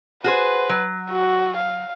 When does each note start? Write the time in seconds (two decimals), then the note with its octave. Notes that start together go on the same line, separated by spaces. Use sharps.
0.24 F#4 G#4 B4 C5
0.69 F#3
1.10 F#4
1.57 F5